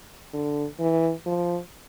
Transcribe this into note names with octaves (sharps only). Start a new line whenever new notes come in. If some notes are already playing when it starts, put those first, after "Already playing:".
D3
E3
F3